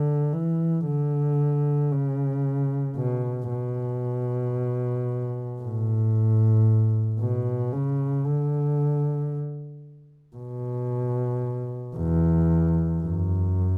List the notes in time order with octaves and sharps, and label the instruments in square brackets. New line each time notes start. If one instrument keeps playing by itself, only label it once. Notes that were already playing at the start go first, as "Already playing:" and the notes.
Already playing: [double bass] D3
E3
D3
C#3
B2
B2
A2
B2
C#3
D3
B2
E2
F#2